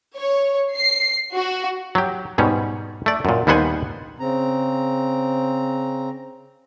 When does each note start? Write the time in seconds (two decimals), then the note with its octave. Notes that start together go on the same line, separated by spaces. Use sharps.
0.15 C#5
0.75 C7
1.34 F#4
1.95 F#3 G4
2.38 G#2 B2 G3 C#4
3.06 A3 D5
3.25 F#2 A#2
3.47 D#2 G3 B3 C5 F#5 G#5
4.20 C#3 C4 A#5